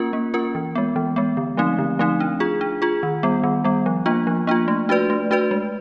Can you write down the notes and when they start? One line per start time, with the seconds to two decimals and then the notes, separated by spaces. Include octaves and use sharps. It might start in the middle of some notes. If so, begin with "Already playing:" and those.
Already playing: A#3 C#4 F4 A#4
0.13 A#3
0.34 C#4 F4 A#4
0.55 E3
0.75 G#3 B3
0.96 E3
1.16 G#3 B3
1.37 D3
1.57 F3 A3 C4 D#4
1.79 D3
1.99 F3 A3 C4 D#4
2.20 D4
2.40 F4 G#4
2.61 D4
2.82 F4 G#4
3.03 D#3
3.23 G3 B3
3.44 D#3
3.64 G3 B3
3.86 F3
4.06 A#3 D4 F4
4.27 F3
4.47 A#3 D4 F4
4.68 A3
4.89 D4 F#4 B4 D5
5.10 A3
5.31 D4 F#4 B4 D5
5.51 G#3